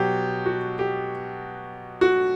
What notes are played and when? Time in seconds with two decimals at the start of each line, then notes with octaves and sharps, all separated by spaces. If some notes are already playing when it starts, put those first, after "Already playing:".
Already playing: B2 F#3 G4
0.46 F#4
0.79 G4
2.01 F#4